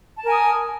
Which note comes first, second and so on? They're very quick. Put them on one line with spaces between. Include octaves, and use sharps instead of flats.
A5 A#4 G#5 D#6